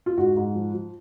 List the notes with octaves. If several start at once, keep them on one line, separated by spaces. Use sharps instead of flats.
F4
G#2 F#4
G#2
F3
F3